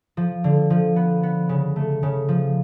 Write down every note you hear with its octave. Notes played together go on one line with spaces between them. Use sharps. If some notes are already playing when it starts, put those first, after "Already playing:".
F3
D3
F3
B3
B3
C#3
A3
C#3
F3